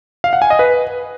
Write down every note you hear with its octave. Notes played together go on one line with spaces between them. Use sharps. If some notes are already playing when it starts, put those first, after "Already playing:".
F5
F#5
G#5
D#5
B4